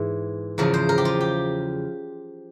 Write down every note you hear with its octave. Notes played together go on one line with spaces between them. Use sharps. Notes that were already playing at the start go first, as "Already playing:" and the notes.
Already playing: G#2 E3
E2 C#3 F3 A#4
C5
A#4
G4
F4
G4